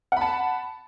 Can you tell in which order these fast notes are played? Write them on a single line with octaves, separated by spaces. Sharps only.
F#5 B5 A5